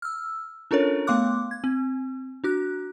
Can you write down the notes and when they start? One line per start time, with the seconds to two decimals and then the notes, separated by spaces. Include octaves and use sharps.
0.02 E6 F6
0.71 C#4 D4 F4 A4 A#4 C#5
1.07 A3 B3 F5 C6 D6 F#6
1.51 G#6
1.64 C4
2.44 D4 F#4 F#6